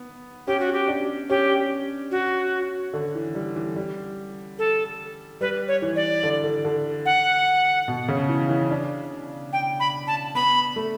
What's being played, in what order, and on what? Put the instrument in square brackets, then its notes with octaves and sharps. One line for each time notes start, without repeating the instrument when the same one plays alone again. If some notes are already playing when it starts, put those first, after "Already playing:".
Already playing: [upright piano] B3
[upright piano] C#4 [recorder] G4
[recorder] F#4
G4
[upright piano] D4
[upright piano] C#4 [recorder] G4
[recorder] F#4
[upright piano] D3
E3
G3
E3
G3
[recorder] A4
[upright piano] G3 [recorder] B4
[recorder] C#5
[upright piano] E3
[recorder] D5
[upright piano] D3
D3
D3
[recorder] F#5
[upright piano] B2
C#3
E3
E3
D4
[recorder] G5
B5
A5
[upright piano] B3 [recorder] B5
[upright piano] A3